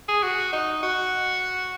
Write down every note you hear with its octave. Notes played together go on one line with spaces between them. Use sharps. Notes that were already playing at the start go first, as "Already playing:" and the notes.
G#4
F#4
D#4
F#4